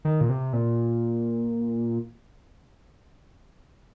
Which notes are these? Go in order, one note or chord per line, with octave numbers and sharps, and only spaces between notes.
D#3
A#2
C3
A#2